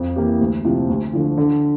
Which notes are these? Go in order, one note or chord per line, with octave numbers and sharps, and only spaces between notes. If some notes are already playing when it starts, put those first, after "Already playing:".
Already playing: F2
E3 A#3 E4 G4
D2
C3 F3
D2
D3 F3
D3